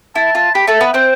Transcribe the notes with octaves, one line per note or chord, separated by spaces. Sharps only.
E4 A5
F4 A5
G4 B5
A3 A4 A5
B3 B4
C4 C5 G5